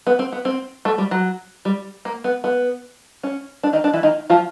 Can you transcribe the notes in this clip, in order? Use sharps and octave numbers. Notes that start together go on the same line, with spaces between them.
B3
C4
B3
C4
A3
G3
F#3
G3
A#3
B3
B3
C#4
D4
D#3 D#4
D4
E3 E4
D#3 D#4
F3 F4